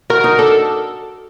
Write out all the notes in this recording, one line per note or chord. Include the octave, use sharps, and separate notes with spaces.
F#4 A#4
D#4
D4 A4